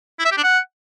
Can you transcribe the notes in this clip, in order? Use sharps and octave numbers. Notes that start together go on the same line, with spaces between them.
E4
E5
G4
D4
F#5